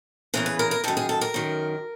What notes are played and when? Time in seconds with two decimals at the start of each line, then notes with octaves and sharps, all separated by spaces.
0.34 E2 C#3 E3 A#4
0.46 B4
0.59 A#4
0.71 A#4
0.84 F#2 D#3 A4
0.97 G#4
1.09 A4
1.21 A#4
1.34 F#2 D#3